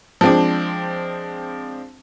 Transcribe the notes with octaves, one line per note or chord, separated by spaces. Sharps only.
F3 G#3 C4 D4